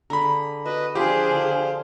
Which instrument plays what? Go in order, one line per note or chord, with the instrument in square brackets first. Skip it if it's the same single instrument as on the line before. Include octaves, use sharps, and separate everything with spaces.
[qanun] D3 G#4 [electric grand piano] A#5 B5
[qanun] F#4 [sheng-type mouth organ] B4 D#5
[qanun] F3 [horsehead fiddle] D4 G#4 [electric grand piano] G4 [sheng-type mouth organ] C5 F5
[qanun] D3 F3